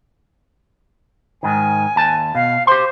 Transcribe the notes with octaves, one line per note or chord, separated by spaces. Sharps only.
G#2 D#3 G#5
D#2 A5
B2 F5
G4 C5 C6